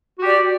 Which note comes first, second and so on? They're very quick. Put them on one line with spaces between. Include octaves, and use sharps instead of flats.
F#4 G4 D5